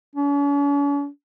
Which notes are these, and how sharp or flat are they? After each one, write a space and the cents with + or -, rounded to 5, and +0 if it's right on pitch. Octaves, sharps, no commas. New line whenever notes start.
C#4 +45